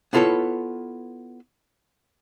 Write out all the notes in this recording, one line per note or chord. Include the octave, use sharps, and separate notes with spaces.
B3 E4 F4 A4 B4 C#5